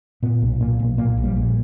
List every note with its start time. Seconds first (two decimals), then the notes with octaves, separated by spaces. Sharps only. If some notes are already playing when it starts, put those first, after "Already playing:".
0.23 A#2 B3
0.42 B1
0.61 A#2 A#3
0.79 B1
0.98 A#2 A#3
1.17 A#1
1.24 G3
1.36 A#2